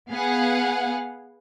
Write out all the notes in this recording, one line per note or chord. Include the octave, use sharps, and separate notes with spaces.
B3 G#4 F5 F#5 G#5